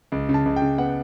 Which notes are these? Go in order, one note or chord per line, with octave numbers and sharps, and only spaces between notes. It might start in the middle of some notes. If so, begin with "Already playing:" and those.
C#2
C#3
A5
C#2
G5
C#3
B3 F#5